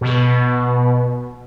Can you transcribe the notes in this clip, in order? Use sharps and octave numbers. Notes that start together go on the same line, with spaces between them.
B2